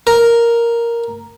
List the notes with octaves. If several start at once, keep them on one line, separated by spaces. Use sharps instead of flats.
A#4